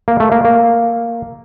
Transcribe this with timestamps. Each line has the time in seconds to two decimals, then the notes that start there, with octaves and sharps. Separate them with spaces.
0.08 A#3
0.20 A3
0.32 A#3
0.45 A#3